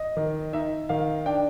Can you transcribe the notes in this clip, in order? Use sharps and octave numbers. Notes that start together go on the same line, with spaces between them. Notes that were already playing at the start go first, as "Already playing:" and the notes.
Already playing: D#5
D#3
D#4 E5
D#3 F5
D4 G5